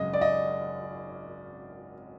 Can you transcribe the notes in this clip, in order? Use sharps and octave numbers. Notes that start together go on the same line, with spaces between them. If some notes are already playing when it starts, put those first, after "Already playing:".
Already playing: G#1 F#2 C#3 D#5
D5
D#5